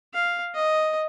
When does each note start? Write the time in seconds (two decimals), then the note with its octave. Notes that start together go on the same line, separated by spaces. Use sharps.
0.14 F5
0.54 D#5